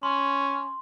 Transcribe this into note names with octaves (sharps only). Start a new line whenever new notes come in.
C#4 C6